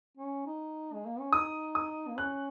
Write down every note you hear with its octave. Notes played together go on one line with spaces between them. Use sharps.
C#4
D#4
G#3
A#3
C#4
D#4 D#6
D#6
A#3
C#4 F#6